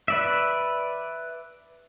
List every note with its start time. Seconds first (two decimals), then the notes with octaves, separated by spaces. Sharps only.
0.08 B4 D5 E5